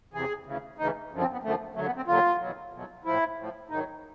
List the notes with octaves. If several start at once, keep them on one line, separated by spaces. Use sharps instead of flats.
E2 C3 E3 G#4
D2 C#3 E3
D2 C#3 E3 D#4
F#2 D3 F3
C4
B3
F#2 D3 F3 A3
D#2 D3 F#3 A3
B3
C4
D#2 D3 F#3 F4
E2 B2 F#3
E2 B2 F#3
A2 F3 E4
A2 F3
G#2 D#3 F#3 D#4